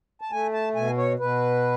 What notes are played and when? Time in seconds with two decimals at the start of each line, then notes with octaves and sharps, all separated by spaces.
0.21 A5
0.31 A3 G#5
0.54 A5
0.75 B2 G#5
0.97 C#5
1.19 B2 B4